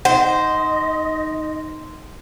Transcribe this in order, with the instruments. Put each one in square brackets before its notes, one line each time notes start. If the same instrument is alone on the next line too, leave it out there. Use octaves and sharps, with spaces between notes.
[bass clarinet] D#4 [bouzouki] C5 [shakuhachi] D#5 [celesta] F#5